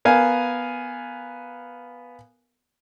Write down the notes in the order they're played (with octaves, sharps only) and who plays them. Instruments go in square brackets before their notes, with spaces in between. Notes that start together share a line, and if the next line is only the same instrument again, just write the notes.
[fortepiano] B3 A#4 F5 G#5